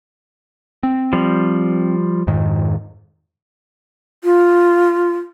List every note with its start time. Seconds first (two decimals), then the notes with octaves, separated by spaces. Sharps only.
0.83 C4
1.13 F3 G3
2.27 F2 G#2 D#3
4.24 F4